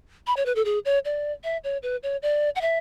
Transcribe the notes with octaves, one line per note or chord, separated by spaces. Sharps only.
B5
C#5
B4
A4
G#4
C#5
D5
E5
C#5
B4
C#5
D5
F#5
E5